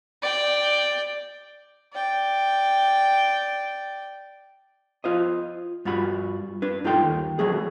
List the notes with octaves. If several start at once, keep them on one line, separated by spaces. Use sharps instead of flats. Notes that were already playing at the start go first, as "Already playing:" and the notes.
D5 G5
D5 G5
F4 C5 D#5
G2 F4 F#4 B5
D4 B4
G2 D#4 F4 A4 G5 C6
D#2
E3 F#3 A3 G#4